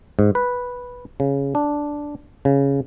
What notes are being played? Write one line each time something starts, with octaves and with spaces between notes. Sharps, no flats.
G#2
B4
C#3
D4
C#3